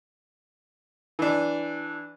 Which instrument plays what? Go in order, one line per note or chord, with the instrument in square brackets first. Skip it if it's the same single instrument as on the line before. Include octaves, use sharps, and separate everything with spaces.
[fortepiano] E3 D4